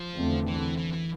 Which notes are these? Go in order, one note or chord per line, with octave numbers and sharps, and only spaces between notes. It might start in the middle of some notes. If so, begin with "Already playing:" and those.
Already playing: F3
E2 D3 A3 C4
E3
E3
E3